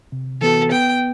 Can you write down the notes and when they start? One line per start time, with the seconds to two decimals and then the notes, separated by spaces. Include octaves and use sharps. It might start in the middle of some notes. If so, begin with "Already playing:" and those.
0.12 C3
0.41 E3 B3 F#4 A4
0.72 B3 G5